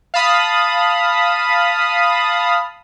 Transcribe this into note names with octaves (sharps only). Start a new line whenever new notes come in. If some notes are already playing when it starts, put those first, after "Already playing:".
F5 A5 B5 D#6